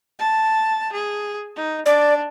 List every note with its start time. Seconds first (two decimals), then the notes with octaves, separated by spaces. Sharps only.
0.19 A5
0.93 G#4
1.56 D#4
1.86 D4 D5